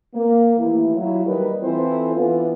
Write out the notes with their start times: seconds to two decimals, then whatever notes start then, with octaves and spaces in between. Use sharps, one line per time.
0.15 A#3
0.58 D#2 E3 A3 E4
0.95 F#3 E4 F4
1.25 D#2 G3 D#4 A#4 B4
1.62 E3 C4 E4 F4 A4 C5
2.13 E3 B3 D4 F4